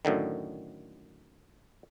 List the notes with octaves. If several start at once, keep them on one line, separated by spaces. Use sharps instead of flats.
F#2 A2 D3 D#3